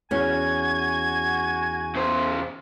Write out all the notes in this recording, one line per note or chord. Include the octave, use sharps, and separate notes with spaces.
E2 C#4 F#4 G#5 G#6
C#3 C5